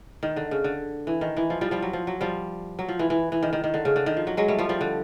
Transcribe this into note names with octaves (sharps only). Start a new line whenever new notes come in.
D#3
D3
C#3
D3
E3
D#3
E3
F3
F3 G3
F3 G3
F#3
F3
F#3
F3 G3
F#3
F3
E3
E3
E3
D#3
D#3
D#3
D3
C#3
D3
D#3
F3
F#3
F#3 G#3
G3 A3
F3 G3
F3 G3
D3